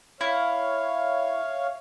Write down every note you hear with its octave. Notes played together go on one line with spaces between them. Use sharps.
E4 C#5 F5